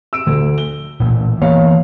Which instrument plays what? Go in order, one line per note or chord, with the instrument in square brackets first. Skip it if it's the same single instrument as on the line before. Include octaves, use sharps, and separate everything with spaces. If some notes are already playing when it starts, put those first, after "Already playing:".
[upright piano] E6 D7
D2
G7
[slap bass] A1 A#2
[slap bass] E3 A#3 B3 [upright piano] C#5 F5